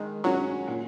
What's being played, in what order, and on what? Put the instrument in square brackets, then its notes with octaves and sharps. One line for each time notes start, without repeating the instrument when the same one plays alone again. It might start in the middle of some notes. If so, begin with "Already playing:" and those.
Already playing: [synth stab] D#3 [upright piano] G#3
[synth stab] F#3 [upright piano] C#4 F#4 C#5
[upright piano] A#2